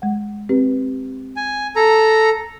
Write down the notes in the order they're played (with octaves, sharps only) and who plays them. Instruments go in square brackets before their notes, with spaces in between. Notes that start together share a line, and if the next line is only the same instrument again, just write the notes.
[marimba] G#3 F#5
C4 G4 B4
[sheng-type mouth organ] G#5
A4 A#5